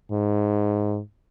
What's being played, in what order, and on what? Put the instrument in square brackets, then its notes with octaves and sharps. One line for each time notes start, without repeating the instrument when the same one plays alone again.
[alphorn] G#2